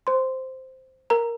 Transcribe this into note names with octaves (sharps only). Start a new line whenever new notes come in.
C5 C6
A#4 A#5